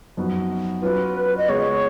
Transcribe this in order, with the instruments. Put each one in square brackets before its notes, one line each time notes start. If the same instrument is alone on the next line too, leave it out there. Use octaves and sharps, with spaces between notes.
[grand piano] F#2 F3 B3 D#4 F#4
[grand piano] F#3 C#4 F4 [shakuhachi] B4
[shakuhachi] D#5
[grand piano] C#3 G#3 B3 [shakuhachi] C#5